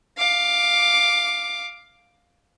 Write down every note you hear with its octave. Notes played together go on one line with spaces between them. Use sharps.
F5 D6